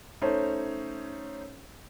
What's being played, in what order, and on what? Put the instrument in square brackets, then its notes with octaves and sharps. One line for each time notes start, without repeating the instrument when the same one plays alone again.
[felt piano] A3 C#4 D#4 C5 C#5